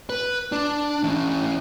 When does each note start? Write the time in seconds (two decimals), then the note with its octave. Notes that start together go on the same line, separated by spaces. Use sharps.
0.10 B4
0.52 D4
1.03 E3 C#4